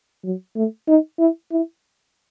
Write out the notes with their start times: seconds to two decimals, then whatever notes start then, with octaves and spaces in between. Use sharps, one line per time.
0.24 F#3
0.56 A3
0.88 D#4
1.19 E4
1.52 E4